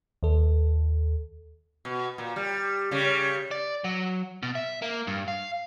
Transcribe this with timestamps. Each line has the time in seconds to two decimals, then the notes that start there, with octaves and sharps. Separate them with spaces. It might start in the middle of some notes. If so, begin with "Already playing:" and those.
0.23 D#2 A4
1.85 B2
2.18 A#2
2.36 G3
2.91 C#3 G3
3.51 D5
3.84 F#3
4.43 B2
4.55 E5
4.82 A#3
5.07 G2
5.28 F5